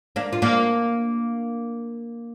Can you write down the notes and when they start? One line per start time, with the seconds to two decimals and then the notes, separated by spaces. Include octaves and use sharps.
0.16 A#3 D4
0.33 F4
0.42 A#3 D4